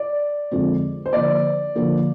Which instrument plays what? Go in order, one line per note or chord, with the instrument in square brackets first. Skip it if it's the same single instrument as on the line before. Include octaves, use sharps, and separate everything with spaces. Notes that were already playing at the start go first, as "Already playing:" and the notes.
Already playing: [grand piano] D5
[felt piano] F2 D3 G#3 C4
[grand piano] C5
[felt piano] D3 F3 A#3 [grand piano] D5
[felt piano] D3 F3 A#3